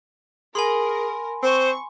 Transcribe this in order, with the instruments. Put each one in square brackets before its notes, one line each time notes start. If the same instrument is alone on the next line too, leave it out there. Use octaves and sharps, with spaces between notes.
[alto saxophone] G#4 [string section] A#4 [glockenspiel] G#5 B5 C6
[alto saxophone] C4 [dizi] C5 [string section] C#6